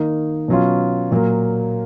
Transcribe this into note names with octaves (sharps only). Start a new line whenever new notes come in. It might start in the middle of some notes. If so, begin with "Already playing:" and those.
Already playing: D#3 A#3 D#4
B2 F#3 C#4 F4
A#2 F#3 A#3